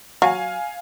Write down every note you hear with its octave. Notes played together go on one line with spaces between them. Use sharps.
F#3 F5 G#5